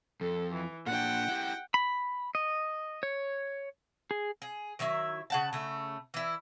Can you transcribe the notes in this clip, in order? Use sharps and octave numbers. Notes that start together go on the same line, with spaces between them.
F2 A4
E3
A#2 D4 F#5 G5
E4 G4
B5
D#5
C#5
G#4
G#4
D#3 F#3 E4 E5
C#3 F#5 A5
C#3 A3
E3 E4